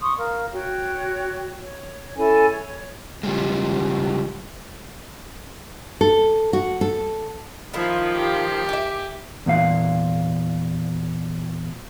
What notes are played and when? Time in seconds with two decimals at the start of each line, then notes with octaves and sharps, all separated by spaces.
0.01 C6 C#6 D#6
0.18 A#4 F5
0.52 F#4 C#5 G5
1.62 C#5
2.17 C#4 E4 A4 G#5
2.52 C#5
3.23 C#3 F3 G3 G#3
6.01 A4
6.53 F#4
6.81 A4
7.74 D#3 F3 E4 F4
8.13 G4
8.69 E5 G#5 D6
9.46 E2 A#2 F5